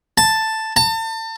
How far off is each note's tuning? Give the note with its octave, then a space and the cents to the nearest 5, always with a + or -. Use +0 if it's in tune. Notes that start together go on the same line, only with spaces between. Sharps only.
A5 +5
A5 +35